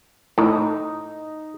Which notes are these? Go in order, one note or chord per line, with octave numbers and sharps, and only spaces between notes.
A2 D#4